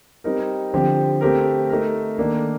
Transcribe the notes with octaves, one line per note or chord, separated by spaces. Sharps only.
G3 C4 D#4 A#4
D3 F3 C4 G4 C5
A3 C4 G4 A#4
A3 D#4 A#4
D#3 A#3 D4 A4 D5